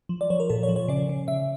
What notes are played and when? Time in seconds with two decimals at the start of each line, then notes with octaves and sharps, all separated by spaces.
0.09 F3
0.21 D5
0.30 F3 C#5
0.40 A#4
0.49 A#2 A4
0.63 C#5
0.69 F3
0.76 C#5
0.88 C#3 D5
1.09 C#3
1.28 C#3 E5